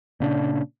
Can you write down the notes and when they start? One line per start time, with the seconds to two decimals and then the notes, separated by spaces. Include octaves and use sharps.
0.20 A#2 C#3 D4